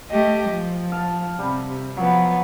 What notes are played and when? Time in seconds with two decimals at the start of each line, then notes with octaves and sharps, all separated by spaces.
0.10 A3 G4 D#5
0.49 F3
0.92 F5 A5
1.39 C3 G3
1.97 F3 F#3 B3